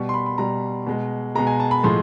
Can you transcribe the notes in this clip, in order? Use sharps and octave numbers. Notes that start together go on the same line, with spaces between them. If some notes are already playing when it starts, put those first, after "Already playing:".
Already playing: B2 G3 C#6
C6
B5
B5
B2 G3 A#5
B2 G#3
B2 G#3 A#5
G#5
A5
B5
A2 F3 G#3 C6